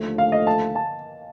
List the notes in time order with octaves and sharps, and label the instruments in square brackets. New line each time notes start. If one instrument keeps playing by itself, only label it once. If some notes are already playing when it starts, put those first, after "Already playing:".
Already playing: [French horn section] D#2 D3 F3 A3
[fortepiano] F5
D#5
A5
A5